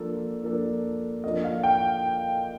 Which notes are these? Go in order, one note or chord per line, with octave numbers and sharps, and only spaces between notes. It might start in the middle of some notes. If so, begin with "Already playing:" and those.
Already playing: F3 A#3 D4 A4
F3 A#3 D4 A4
F3 A#3 D4 A4 D#5
F5
G5